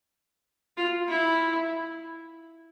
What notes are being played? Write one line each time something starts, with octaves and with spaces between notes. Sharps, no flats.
F4
E4